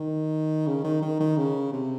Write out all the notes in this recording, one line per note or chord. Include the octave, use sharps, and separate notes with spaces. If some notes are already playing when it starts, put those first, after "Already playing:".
Already playing: D#3
C#3
D#3
D#3
D#3
C#3
C3